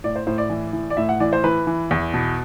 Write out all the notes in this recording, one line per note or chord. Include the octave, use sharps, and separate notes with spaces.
A2 D5
C5
A2 C5
D5
E3
E3
D5
A2 E5
F#5
E3 D5
C5
E3 B4
E3
E2
B2